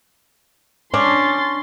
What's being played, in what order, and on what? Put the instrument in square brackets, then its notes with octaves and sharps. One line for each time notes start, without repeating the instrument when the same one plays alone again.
[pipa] C#4 [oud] D4 [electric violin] C6 A6